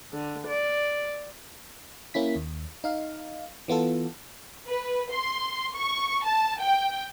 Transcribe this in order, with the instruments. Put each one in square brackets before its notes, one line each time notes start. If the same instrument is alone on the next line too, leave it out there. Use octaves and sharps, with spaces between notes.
[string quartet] D3
D5
[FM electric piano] A#3 C#4 E4 B6
D#2
D#4 F5
E3 B3 F4 A4
[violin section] B4
C6
C#6
A5
G5